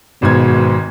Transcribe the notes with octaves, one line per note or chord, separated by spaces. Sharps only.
G#1 G#2 B2 G#6